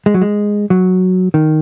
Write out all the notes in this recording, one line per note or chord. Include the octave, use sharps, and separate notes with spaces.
G#3
F#3
G#3
F#3
D#3